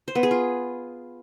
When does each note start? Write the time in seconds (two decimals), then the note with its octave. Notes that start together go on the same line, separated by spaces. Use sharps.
0.08 C5
0.15 B3
0.23 G#4
0.31 F4